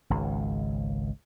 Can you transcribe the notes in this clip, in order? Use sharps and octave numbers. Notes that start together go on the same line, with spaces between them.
G#1 C#2